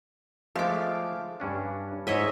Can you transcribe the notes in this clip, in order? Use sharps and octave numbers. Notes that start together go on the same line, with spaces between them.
F3 G#3 A3 F5 D6
G2 C#4 D4
G#2 C#5 D#5 E5